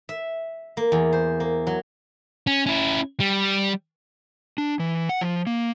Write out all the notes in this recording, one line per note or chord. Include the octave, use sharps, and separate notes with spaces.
E5
A#3
E2
C5
A#3
F#3
C#4
C#4 E4
G3
D4
E3
F#5
F3
A#3